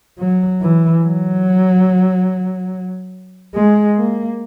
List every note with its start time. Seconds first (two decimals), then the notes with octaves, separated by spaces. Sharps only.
0.19 F#3
0.62 E3
1.03 F#3
3.55 G#3
3.97 A#3